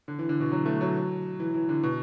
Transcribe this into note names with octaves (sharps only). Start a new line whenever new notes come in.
D3
E3
D3
B2
F#3
A3
F#3
E3
E3
D3
B2